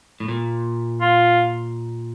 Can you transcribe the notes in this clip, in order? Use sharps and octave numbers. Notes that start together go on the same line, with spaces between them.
A2
A#2
F4